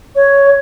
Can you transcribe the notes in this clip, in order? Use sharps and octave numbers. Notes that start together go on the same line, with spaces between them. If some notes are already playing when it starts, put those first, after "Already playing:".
C#5